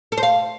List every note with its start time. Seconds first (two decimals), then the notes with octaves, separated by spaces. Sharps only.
0.12 A4
0.17 C5
0.23 F5